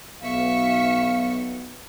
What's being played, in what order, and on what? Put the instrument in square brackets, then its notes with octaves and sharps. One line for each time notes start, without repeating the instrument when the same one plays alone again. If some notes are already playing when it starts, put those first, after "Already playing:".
[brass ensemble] B1 B2 B3 [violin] E5 C#6 [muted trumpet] F5